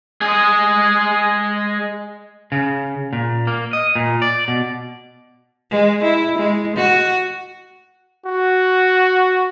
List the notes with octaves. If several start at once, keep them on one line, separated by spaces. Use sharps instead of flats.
G#3 G#4
C#3
A#2
A#3
D#5
A#2
D5
B2
G#3
E4
G#3
F#4
F#4